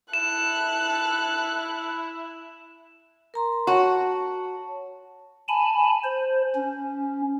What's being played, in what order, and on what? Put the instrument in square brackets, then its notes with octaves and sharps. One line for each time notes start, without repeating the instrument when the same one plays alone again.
[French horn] E4 [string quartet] A4 [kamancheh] F#6 [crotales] E7
[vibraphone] A#4 A#5 C6
[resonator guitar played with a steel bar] F#4 [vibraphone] C#5 A5
[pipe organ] G#5 A5 B5
C5
C#4